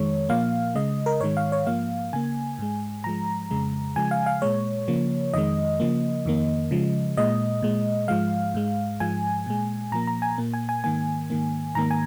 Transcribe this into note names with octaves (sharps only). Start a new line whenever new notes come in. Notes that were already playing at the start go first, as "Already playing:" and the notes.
Already playing: F2 D#3 G#3 C#5
A#2 F3 A#3 F5
C#3 G#3 D#5
A#4
G#2 D#3 G#3 C#5
F5
C#5
G#2 F3 A#3 F5
C#3 A#3 G#5
G#2 G#3
G#2 F3 G#3 A#5
F2 C#3 G#3
C#3 F3 G#3 G#5
F5
F5
A#2 G#3 C#5
C#3 F3 A#3
F2 D#3 G#3 D#5
C#3 F3 A#3
F2 D#3 A#3
C#3 F3 G#3
A#2 G#3 D#5
A#2 G#3
G#2 F3 G#3 F5
G#2 G#3
G#2 F3 G#3 G#5
A#2 G#3
A#2 F3 A#3 A#5
A#5
G#5
A#2 A#3
G#5
G#5
G#2 D#3 A#3 G#5
G#2 D#3 A#3
G#2 D#3 A#3 A#5
G#5